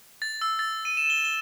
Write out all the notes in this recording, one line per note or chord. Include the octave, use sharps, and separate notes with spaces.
A6
E6
A6
D#7
E7
G7
G7